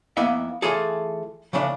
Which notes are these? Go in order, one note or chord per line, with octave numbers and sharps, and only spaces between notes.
F2 A#3 B3 E4 D#5 E5
E3 A3 F4 G#4 A4
C#3 E3 F3 A3 D4